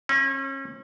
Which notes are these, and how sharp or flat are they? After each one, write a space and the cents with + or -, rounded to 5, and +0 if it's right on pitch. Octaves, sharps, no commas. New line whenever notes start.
C#4 -35